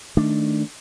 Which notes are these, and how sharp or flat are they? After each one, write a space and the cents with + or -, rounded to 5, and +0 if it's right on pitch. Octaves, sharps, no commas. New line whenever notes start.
D#3 +0 A3 +0 D4 +0